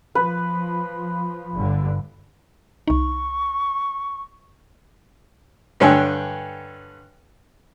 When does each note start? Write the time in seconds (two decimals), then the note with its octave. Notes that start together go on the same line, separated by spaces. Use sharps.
0.15 F3 B4
1.53 G1 G2 D3
2.88 C2 D#4 C#6
5.80 G2 D3 C#5 G5 G#5 E6